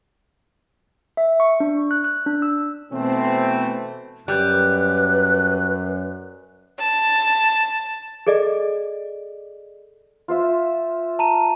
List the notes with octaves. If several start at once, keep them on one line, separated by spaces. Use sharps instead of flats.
E5
C#6
D4
F#6
F#6
D4
E6
B2 E3 A3 C4
F#2 G3 B4 F#6
A5
G#4 A4 D5 D#5
F4 C5 E5
A5 A#5 D#7